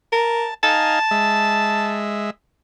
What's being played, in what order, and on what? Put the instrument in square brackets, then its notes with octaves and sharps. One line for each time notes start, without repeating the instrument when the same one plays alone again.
[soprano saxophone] A#4 [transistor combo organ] A5
[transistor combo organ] D#4 F5 G#5 [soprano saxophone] A5
[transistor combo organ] G#3 E5